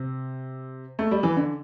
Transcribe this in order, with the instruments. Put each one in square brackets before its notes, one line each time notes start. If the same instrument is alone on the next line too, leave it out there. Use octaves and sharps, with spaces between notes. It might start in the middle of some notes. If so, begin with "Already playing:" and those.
Already playing: [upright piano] C3
A3
G3
E3
D3